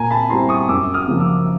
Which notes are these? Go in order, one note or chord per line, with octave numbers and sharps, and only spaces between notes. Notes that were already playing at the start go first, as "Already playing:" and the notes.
Already playing: A#2 G#5 A#5
A5 B5
G3 C4 E4 A#5 C6
C#6 D#6
F#2 D6 E6
D#6 F6
C#3 F3 A#3
D6 E6